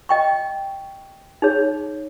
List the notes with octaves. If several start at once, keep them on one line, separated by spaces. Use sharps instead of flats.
D#5 G5 C#6
D#4 G#4 C#5